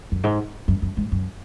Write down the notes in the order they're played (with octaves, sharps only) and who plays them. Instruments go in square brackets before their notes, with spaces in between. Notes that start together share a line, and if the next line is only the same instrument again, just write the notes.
[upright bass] F#2
G#2
F#2
F#2
G#2
F#2